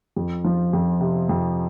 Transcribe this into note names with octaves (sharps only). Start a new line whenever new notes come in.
F2
F3
F2
C3
F2